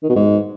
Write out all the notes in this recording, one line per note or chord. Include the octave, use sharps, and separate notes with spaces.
D#3
B2
G#2